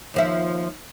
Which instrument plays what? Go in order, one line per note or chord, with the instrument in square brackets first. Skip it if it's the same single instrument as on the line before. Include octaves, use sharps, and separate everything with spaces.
[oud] D#2 F3 E5